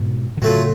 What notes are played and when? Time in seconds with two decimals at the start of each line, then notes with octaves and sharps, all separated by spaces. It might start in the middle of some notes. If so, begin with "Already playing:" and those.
Already playing: G#2 B2
0.37 D3
0.42 A2 C#3 F#3 A3 F4